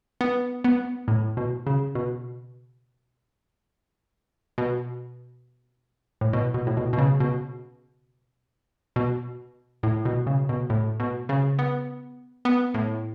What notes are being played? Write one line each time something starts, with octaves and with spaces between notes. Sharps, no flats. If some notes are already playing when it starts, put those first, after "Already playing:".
B3
B3
A2
B2
C#3
B2
B2
A2
B2
B2
A2
B2
B2
C#3
B2
B2
A2
B2
C#3
B2
A2
B2
C#3
B3
B3
A2